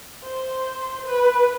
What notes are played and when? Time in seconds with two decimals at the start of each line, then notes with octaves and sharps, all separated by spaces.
0.24 C5
1.06 B4